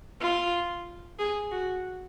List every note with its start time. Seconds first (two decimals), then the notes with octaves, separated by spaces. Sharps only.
0.21 F4
1.19 G#4
1.52 F#4